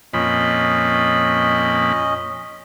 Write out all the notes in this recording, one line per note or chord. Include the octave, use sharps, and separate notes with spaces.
F2 A#2 C#4 D#5 B5